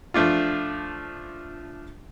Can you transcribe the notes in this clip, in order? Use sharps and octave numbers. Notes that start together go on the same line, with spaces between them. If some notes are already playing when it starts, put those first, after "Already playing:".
F3 A3 D4 F4